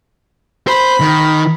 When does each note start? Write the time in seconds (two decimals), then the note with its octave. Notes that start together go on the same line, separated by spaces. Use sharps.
0.67 C5 B5
1.01 D#3